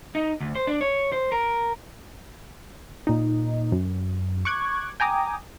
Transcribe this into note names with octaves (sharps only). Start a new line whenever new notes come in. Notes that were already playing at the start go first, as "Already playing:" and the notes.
D#4
D2
C5
D4
C#5
C5
A#4
A#2 D#4
F#2
C#6 D6 F#6 G#6
G5 G#5 A#5 D6 D#6